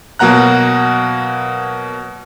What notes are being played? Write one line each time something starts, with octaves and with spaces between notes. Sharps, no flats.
B2 F#3 A#3 F#5 A#5 F#6